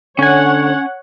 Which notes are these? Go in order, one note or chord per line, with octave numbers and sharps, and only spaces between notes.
D3 C#4 C#5 F#5 G#5